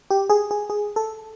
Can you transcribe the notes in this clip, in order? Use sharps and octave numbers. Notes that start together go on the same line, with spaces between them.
G4
G#4
G#4
G#4
A4